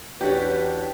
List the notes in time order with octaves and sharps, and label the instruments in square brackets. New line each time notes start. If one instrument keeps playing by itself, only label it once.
[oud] E2 F#4 C#5 [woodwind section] C#4 D4 [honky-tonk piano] G4 [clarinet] B4